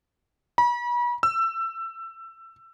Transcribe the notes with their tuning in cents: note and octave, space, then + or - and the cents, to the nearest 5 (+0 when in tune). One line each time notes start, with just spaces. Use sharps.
B5 -40
E6 +20